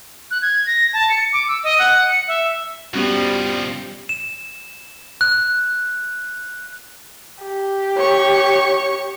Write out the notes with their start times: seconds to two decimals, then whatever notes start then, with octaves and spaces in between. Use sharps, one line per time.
0.31 F#6
0.42 G#6
0.66 A#6
0.93 A5
1.10 C#7
1.33 D6
1.48 E6
1.64 D#5
1.79 F#5
2.10 C#7
2.28 E5
2.94 C2 F3 G3 B3 C#4 F#4
4.09 E7
5.21 F#6
7.44 G4
7.97 C#5 C#6